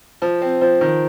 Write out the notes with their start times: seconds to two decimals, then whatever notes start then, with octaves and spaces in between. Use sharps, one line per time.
0.22 F3
0.42 C4
0.61 F3
0.81 D#3